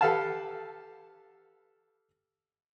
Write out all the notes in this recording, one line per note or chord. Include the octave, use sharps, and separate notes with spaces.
G4 A4 B4 F5 F#5 A5